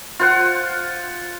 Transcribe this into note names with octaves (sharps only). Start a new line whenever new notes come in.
F4 C5 F#5